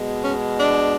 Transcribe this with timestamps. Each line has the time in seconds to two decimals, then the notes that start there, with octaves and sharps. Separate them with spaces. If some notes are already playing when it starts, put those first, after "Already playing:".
Already playing: B2 G#3
0.23 C#4
0.60 D4